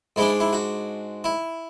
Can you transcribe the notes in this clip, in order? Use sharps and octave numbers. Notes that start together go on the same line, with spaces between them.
G#2 G#3 D4 E4
E4
F#4
E4